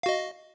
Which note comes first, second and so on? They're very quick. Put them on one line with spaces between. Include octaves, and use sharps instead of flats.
F5 F#4 D#5